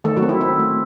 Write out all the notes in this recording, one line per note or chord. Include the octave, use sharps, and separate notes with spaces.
D#3 A3 A4
F#3 F#4
C4
E4
C4 E4
A3